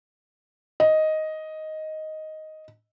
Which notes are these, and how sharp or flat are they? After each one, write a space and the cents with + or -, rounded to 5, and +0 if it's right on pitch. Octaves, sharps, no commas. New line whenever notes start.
D#5 +5